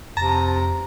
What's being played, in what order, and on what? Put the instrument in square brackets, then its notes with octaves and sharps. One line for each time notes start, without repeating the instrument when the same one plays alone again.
[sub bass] F2 [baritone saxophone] C3 [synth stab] A5 [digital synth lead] A#5